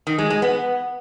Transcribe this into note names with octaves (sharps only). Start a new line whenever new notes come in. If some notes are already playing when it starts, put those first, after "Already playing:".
D#3
G#3
G#3
B3